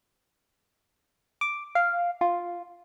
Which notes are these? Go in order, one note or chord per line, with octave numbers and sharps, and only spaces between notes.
D6
F5
F4